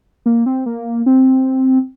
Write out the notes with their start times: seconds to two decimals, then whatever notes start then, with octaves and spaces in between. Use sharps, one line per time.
0.26 A#3
0.46 C4
0.66 A#3
1.06 C4